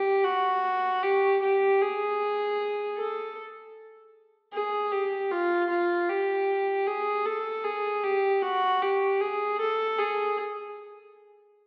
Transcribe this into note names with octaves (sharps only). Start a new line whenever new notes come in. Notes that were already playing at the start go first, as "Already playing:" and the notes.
Already playing: G4
F#4
G4
G4
G#4
A4
G#4
G4
F4
F4
G4
G#4
A4
G#4
G4
F#4
G4
G#4
A4
G#4